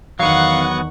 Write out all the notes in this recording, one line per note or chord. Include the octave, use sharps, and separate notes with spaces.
E2 D#3 F#3 B3 F5 F#5 C#6